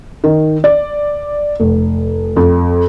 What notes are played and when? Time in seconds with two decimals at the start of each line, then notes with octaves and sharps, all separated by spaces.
0.24 D#3
0.64 D5
1.60 F1
2.36 F2